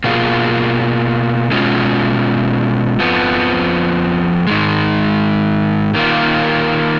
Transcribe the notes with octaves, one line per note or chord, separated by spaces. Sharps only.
B2 A#3 F4 G#4
B2 G#3 C#4 F4
F2 F3 B3
G#2 D#3 G#3
D#3 A#3 F4